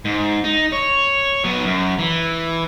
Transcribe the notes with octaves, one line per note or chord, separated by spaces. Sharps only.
G#2
D#4
C#5
F#3 B3
F#2
E3